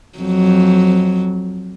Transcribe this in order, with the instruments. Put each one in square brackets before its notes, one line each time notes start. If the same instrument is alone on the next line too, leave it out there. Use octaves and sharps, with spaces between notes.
[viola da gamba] F2 F#3